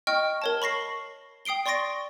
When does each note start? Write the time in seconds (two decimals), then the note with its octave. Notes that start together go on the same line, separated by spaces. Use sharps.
0.07 D#5 G5 C#6 F6
0.42 A#4 C#5 A5
0.62 B5 C#6 A#6 C7
1.45 G5 D#6 C7 D7 G7
1.66 D5 C6 C#6 A6 A#6 D7